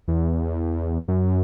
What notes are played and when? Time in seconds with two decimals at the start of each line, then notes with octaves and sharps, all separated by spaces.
0.08 E2
1.08 F#2